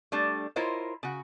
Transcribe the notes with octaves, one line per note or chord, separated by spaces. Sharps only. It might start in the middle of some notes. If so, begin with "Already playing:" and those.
G3 A3 D4
E4 F4 A#4 C5 C#5 D#5
C#3 F#4